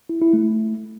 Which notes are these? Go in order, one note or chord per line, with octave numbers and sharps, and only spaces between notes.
E4
E4
A3